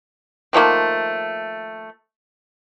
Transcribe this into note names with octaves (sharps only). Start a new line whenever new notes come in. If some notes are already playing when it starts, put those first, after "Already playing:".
D#3 F3 A3 A#3